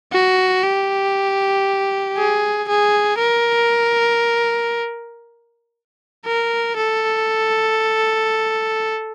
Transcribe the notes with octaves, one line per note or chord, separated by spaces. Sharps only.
F#4
G4
G#4
G#4
A#4
A#4
A4